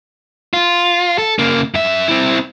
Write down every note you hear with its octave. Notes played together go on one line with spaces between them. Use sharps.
F4
A4
C#3 A#3
F#2 E5
C4 E4